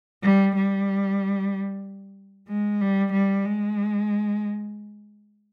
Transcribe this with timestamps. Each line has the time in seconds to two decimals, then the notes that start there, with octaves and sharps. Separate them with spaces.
0.23 G3
0.56 G3
2.48 G#3
2.81 G3
3.13 G3
3.45 G#3